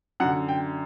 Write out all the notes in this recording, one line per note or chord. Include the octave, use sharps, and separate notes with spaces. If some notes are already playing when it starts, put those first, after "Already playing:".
F#2 D3 F#5
G5